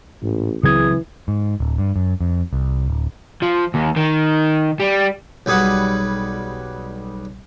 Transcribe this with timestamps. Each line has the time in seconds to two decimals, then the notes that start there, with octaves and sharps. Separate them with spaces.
0.22 A1 G#2
0.63 C#2 C#3 E3 F#3 C4 G#4 D#6 G#6
1.28 G#2
1.60 D1
1.78 G2
1.96 F#2
2.21 F2
2.53 C2
2.88 D1
3.42 F3
3.75 D#2
3.97 D#3
4.80 G3
5.46 B1 G3 G#4 B4 F#5